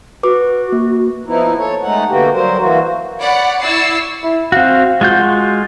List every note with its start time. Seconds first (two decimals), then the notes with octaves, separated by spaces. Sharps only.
0.23 F#4 B4 D6
0.72 A#3
1.26 F3 B3 D#4 E4
1.58 A4 C#5
1.82 G#3 A3 D#4 F#5
2.09 D3 A#3 B3 F#4 G4
2.33 F#3 G3 A#4 C5
2.59 E3 A#3 F#4
3.19 C#5 D5 F#5 B5
3.59 E4 D5 C#6 E6 A6 C7
4.23 E4
4.52 C4 F#4 F5
5.01 G#3 F4 F#4 G6